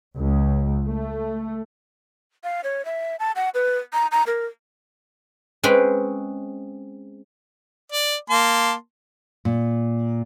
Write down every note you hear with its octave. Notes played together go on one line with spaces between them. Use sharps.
C#2
A3
F5
C#5
E5
A5
F#5
B4
A#5
A#5
A#4
G#3 C4 C#4 G#4 B4 G5
D5
A#3 A5 C6
A#2